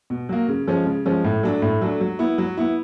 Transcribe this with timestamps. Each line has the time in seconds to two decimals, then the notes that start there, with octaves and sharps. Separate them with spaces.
0.10 B2
0.29 F#3 A#3
0.48 C#3
0.68 F3 G#3 C#4
0.86 C#3
1.05 F3 G#3 C#4
1.24 A2
1.43 F#3 A3 D4
1.62 A2
1.81 F#3 A3 D4
2.01 F#3
2.19 B3 E4
2.38 F#3
2.57 B3 E4